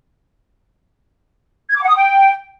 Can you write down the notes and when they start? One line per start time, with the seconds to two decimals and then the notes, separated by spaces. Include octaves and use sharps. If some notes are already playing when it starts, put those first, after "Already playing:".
1.70 G#6
1.76 D6
1.82 F#5
1.89 D#6
1.95 G5